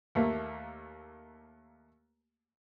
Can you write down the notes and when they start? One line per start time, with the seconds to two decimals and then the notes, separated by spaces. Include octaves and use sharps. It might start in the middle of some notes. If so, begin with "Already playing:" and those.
0.15 D#2 A3 A#3